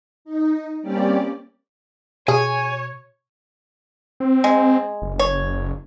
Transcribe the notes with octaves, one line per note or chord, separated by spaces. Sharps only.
D#4
G3 A#3 C4 C#4 G4 D5
B2 G#4 C#5 G#5
C4
G#3
F#1
C#5